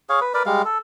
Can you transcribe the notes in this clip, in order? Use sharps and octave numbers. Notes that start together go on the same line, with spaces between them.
G#4 C#5 F5
B4
A#4 B4 D5
G3 G#3 F5
A4